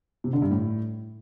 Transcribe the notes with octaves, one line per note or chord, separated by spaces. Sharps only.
C3
D3
G2
A2